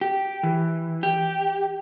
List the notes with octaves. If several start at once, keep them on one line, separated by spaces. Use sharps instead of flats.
G4
E3
G4